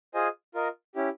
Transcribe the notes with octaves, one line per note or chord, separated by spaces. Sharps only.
F4 G#4 C5 D#5 G#5
F4 A#4 D#5
C#4 E4 G4